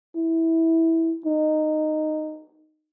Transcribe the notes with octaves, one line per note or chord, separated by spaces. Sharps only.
E4
D#4